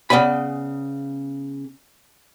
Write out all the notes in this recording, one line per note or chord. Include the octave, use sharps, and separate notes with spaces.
C#3 B3 D5 G#5 B5